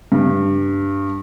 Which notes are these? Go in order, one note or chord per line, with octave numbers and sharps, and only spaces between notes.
G2